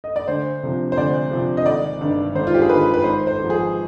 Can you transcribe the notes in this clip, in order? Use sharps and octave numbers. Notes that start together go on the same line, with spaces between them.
D#5
D5
D2 C5
C3 F3
C5
D2 D5
C3 F3
D#5
G#1 D5
G2 D#3
G#1 C5
F4
G4
G#4
G2 D#3 B4
B4
G#1 C5
C5
G#2
F3
G#4